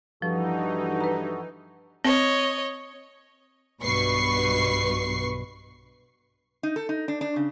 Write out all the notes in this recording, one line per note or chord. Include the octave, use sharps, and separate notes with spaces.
G2 E3 F3 D#4 F#4 A4
B4 A#5
C4 C#5 D#5
B1 G2 B2 B4 C#6 C7
D#4
A4
D#4
D4
D4
C#3